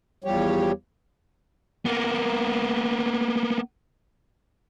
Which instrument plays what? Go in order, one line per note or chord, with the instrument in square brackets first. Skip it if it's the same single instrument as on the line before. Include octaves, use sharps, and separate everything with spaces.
[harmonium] E2 F3 G3 G4 C#5
[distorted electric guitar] A#3 B3